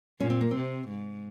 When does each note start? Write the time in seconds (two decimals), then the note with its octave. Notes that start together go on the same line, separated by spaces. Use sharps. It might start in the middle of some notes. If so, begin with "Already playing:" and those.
0.20 A#2 C#4
0.30 C4
0.41 A#3
0.51 C3 C4
0.89 G#2